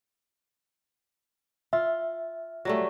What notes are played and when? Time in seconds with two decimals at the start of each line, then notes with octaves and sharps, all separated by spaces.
1.73 F4 E5
2.65 F#3 G3 A3